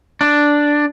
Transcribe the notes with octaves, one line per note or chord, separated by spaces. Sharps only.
D4